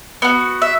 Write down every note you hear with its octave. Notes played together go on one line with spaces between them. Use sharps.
B3 F#4
E5